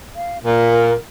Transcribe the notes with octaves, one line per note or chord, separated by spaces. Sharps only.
F5
A#2 A#4